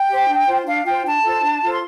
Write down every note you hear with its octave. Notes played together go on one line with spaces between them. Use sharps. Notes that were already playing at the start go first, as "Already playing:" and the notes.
Already playing: G5
G4 C5
D4
F4 C5
D4 F5
F4 C5 G5
D4 A5
F4 A4 C5
D4
F4 A4 C5
C6